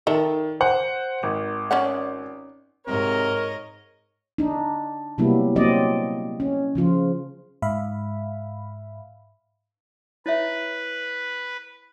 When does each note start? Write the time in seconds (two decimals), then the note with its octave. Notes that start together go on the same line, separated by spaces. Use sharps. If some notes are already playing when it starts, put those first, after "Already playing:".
0.07 D#3 A4 D5 E5
0.61 C5 F#5
1.23 G#1
1.71 C#4 D5 F#5
2.87 G#2 C3 A#4 C#5 D#5
4.38 D4 D#4
5.18 C3 F#3 G3 A#3 B3 E4
5.56 F#3 A#3 C4 D5 D#5
6.40 C#4
6.75 C#3 F3 F4
7.62 G#2 E5 F5 B5
10.26 E4 B4 C#5 E5